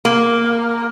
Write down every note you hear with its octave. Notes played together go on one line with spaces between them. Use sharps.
A#3